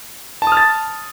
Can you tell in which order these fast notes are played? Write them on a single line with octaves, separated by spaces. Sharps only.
A5 D#6 F6 A6